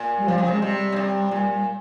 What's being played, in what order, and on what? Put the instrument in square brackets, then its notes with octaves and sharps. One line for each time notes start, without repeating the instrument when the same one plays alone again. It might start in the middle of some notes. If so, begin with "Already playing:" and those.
Already playing: [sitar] A#2
[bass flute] G3
[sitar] C3 [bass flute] F3
[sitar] C#3
[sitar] C3 [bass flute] G#3
[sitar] C3 [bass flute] G3
[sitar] C#3
C3
A#2